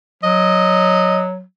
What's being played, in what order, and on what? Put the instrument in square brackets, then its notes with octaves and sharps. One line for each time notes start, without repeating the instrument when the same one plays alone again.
[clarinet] F#3 [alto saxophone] D#5